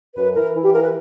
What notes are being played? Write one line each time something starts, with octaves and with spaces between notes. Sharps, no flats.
F#2 B4
E3 A#4
E3
G4
E3 A#4
B4